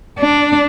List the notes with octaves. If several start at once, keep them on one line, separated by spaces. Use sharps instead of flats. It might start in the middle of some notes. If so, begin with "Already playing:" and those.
D4